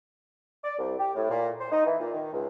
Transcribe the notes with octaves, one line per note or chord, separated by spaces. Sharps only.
D5
C2
G4
A2
A#2
C5
D#4
E3
A#2
D#3
C#2